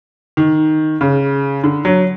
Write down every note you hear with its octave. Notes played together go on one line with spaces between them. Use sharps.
D#3
C#3
D3
F#3